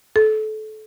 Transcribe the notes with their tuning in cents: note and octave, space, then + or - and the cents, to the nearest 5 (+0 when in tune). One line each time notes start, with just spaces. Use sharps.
A4 -25